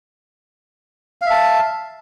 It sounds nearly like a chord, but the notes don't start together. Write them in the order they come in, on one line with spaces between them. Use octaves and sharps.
F5 E5 A5